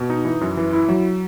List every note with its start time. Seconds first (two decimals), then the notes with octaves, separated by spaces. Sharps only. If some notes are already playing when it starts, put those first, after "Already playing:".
Already playing: B2
0.10 D#4
0.25 E3
0.41 F#2
0.57 E3
0.73 E4
0.88 F#3